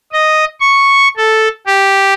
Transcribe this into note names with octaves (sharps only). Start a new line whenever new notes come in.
D#5
C#6
A4
G4